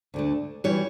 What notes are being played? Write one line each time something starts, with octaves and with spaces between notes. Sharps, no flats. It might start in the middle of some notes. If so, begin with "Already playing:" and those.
D2 D3 A3
E3 G3 C#5